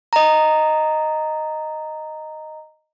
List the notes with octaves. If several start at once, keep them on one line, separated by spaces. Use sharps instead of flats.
D#5 A#5